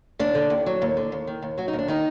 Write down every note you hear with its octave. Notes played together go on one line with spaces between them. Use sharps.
D#2 D4
D3
D#2
F#3
D#2
D3
D#2
D#3
D#2
F#3 F#4
D#4
D#2
D4
D#3 D#4